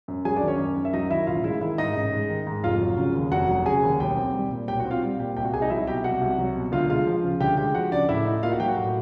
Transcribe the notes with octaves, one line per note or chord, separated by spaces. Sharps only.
F#2
F#3 G#4 G#5
D4 D5
D#3
C#4 C#5
F#2
F#2
E5
F#3 D#4 D#5
D#3 E4 E5
A1 F4 F5
G#3 E4 E5
D#3 E4 E5
G#2 D#4 D#5
A1
G#3
D#3
G#2
F1 F4 F5
F#3
C#3
D#2
F1 F#4 F#5
F#3
C#3 G#4 G#5
D#2
B1 G4 G5
C4
G3
A#2
B1 G4 G5
F#4 F#5
C4
F4 F5
G3
A#2 G4 G5
C2 G4 G5
F#4 F#5
C2 G#4 G#5
D#4 D#5
F#3 E4 E5
B2 G4 G5
C2 F#4 F#5
C2
F#3
B2
D2 F4 F5
G#3 F4 F5
F3
C#3
D2 G4 G5
G#3 G4 G5
F3 F#4 F#5
C#3 D4 D5
A2 E4 E5
D#4
A#3 F4 F5
F#4 F#5
F#3 G4 G5
F#4 F#5
A2